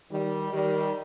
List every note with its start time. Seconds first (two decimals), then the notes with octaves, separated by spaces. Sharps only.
0.10 D#3 G3
0.53 D#3 G3